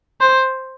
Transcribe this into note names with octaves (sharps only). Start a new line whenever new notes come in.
C5